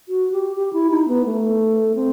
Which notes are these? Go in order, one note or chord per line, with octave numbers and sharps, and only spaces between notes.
F#4
G4
G4
E4
D#4
B3
A3
C4